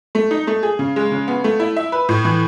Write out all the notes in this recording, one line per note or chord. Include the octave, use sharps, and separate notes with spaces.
A3
D#4
A3
G#4
C#3
G#3
C#3
B3
A3
E4
E5
B4
A2
E3